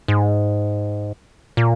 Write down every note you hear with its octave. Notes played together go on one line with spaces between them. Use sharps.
G#2
A#2